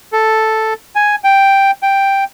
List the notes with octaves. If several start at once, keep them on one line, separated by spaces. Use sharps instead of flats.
A4
G#5
G5
G5